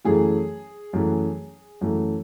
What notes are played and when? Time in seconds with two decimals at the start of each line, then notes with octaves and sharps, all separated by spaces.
0.05 F#2 E3 A3 G#4
0.93 F#2 E3 A3
1.81 F#2 E3 A3